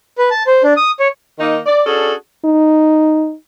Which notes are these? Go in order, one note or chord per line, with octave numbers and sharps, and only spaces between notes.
B4
A5
C5
D4
D#6
C#5
D#3 A#3 D#4
D5
C#4 D4 F#4 G#4 A4
D#4